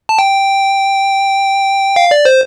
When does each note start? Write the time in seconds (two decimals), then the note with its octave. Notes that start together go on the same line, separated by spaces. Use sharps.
0.09 A5
0.18 G5
1.96 F5
2.11 D5
2.25 C5